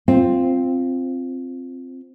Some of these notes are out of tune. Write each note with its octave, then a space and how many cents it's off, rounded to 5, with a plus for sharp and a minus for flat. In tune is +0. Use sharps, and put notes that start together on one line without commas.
C4 +0 F4 +0